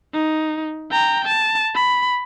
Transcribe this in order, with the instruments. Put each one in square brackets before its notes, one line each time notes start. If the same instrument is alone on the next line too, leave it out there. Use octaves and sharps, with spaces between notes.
[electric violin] D#4
G5 A#5
A5
B5